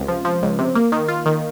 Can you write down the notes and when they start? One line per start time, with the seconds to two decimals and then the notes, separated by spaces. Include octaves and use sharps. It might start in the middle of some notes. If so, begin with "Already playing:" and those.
Already playing: C#2 C3
0.08 F3
0.25 F3
0.42 C#2
0.59 C3
0.75 A#3
0.92 D#3
1.08 F4
1.26 D#3